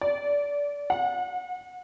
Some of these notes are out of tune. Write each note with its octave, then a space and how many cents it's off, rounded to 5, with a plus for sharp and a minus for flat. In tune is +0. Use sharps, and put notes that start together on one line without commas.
D5 -25
F#5 -30